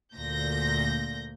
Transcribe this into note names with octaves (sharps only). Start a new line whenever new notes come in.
D2 A#2 G6 A#6